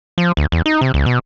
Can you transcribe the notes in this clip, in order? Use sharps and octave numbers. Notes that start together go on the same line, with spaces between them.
F3
D2
E2
D#4
C3
C#2
B2